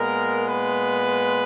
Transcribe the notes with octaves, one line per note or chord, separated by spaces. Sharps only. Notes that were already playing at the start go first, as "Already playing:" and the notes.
Already playing: A#2 G#3 B3 A#4
B4